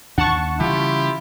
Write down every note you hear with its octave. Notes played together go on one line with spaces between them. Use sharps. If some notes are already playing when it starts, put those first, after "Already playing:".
D#2 D4 F#5 A5 C#6
C#3 E3 G3 E4 F4 G4